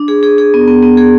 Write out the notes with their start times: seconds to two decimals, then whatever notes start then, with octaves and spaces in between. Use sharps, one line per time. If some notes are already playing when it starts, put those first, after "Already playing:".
Already playing: D4
0.08 G#4
0.23 G#4
0.38 G#4
0.54 B3
0.68 B3
0.83 B3
0.97 G#4